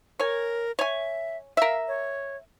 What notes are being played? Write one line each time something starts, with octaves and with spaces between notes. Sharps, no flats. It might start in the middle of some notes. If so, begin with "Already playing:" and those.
A#4 C#5 G#5
C#5 E5 G#5
A#4 E5 F5
C#5